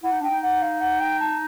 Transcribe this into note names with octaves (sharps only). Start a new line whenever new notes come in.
E4 F#5
D#4
D4 G5
D#4
F#5
F5
F#5
G5
A5